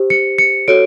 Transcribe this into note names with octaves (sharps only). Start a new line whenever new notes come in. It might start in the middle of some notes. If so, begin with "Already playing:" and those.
Already playing: G4 C5
C#7
C#7
F#4 A4 C#5 D7